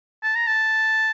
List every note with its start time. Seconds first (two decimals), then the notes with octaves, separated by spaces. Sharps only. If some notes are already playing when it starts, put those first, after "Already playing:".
0.23 A5
0.35 A#5
0.47 A5